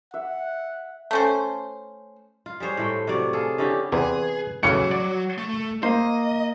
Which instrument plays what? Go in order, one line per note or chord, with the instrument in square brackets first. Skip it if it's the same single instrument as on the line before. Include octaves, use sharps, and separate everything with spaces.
[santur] E5 [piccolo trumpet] F#5
[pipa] A3 C#4 C5
[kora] F4
G3 G#4 C5 C#5
A2 A3 G5
C3 F#3 C#5 D5
F4 G#4 A4
D3 C#4 E4 G4
[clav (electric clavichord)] E2 C3 [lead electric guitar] G#4 [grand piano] B4
[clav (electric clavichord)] A2 C#3 E3 [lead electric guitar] F#3 [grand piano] C#7
[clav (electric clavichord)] D5
[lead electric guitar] A3
[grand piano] A#3 [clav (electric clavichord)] C5 [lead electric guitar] D#5